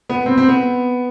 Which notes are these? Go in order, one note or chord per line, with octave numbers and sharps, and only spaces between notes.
B3
C4
C4
B3